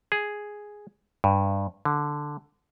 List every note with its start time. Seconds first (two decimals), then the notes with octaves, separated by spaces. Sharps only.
0.12 G#4
1.24 G2
1.85 D3